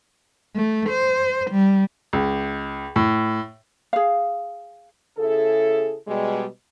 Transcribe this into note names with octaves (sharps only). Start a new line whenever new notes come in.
A3
C5
G3
C#2
A2
G#4 F5
C#3 E4 G#4 A4
B2 G3 G#3